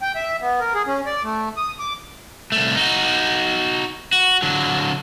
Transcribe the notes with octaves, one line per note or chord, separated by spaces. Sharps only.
G5
E5
B3
A#4
G#4
C#4
D5
A3
D#6
D6
C2 A3
D#4 F#4
F#4
D3 F#3